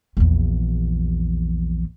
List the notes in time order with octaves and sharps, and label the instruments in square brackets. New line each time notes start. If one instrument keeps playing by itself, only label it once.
[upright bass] A#1 E2